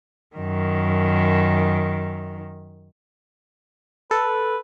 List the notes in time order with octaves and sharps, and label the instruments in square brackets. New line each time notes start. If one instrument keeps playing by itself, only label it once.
[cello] F#2 D#3
[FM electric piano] A4 [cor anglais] B4